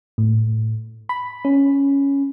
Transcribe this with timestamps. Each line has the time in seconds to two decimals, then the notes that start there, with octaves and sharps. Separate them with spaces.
0.18 A2
1.09 B5
1.45 C#4